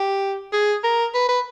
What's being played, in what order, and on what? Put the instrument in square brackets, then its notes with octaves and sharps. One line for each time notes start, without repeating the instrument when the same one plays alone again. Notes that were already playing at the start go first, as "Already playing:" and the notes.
Already playing: [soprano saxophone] G4
G#4
A#4
B4
B4